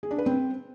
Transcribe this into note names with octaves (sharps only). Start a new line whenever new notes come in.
G#4
D4
B4
C4